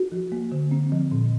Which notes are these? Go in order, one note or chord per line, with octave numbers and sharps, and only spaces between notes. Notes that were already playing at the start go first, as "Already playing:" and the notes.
Already playing: F#4
F3
A#3
D3
C4
F3
A#2